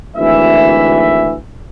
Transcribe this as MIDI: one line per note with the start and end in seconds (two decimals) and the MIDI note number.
0.16 1.35 32
0.16 1.35 38
0.16 1.35 52
0.16 1.35 76